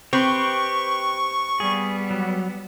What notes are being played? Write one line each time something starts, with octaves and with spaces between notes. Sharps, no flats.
C4 G4 B4 C#6
G3 B3 G#4
F#3